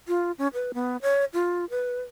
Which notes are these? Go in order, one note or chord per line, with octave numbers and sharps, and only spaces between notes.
F4
C#4
B4
B3
C#5
F4
B4